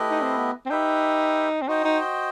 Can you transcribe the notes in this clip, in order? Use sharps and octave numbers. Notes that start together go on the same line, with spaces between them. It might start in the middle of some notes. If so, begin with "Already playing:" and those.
Already playing: A3 E4 G4 B4 D#5
D#4
C4
B3
C4
D#4 G4 B4 E5 G5
C4
D#4 F#4 C5 D#5 G5
D#4